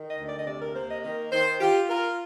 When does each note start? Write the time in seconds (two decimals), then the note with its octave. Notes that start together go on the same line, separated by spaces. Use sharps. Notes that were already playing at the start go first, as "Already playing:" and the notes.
Already playing: D#3
0.09 D#5
0.18 D2
0.28 D5
0.39 D#5
0.46 C3 D5
0.61 A#4
0.75 A#3 C5
0.89 D#5
1.03 D#3 D#5
1.32 D#3 C5
1.61 F4 G4
1.89 F4 A#4